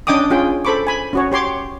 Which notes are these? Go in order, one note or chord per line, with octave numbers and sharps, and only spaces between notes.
C#4 D4 D#5 G5 D6 D#6
C#4 F4 G#4 G5
A4 C5 B5 C#6 D6
G#5 B5
C#4 F#4 C#5
G4 C#5 C6 D6